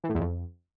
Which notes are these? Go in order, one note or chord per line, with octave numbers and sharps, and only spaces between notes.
E3
A2
E2
F2